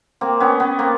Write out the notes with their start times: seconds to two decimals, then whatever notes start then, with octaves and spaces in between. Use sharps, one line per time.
0.21 A#3 C4
0.40 B3 C#4
0.60 B3 C#4
0.79 A#3 C4